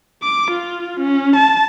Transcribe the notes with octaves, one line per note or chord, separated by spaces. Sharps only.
D6
F4
C#4
A5